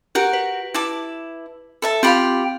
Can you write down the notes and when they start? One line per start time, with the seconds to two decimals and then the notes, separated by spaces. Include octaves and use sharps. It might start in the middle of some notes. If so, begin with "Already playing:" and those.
0.15 F#4 G4 A#4
0.33 B4
0.74 E4 A5 D6
1.82 A4 E5 A5 B5
2.03 C4 F4 G4 F5 B5